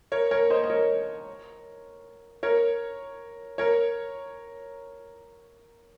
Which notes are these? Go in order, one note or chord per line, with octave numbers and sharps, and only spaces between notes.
A#4 C#5
A#4 C#5
C5 D#5
D#5
A#4 C#5
A#4 C#5
A#4 C#5